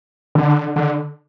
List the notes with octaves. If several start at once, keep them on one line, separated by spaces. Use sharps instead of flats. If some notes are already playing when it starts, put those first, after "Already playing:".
D3
D3